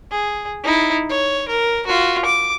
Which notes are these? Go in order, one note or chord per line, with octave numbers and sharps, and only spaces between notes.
G#4
D#4 E4
C#5
A#4
F4 F#4
D6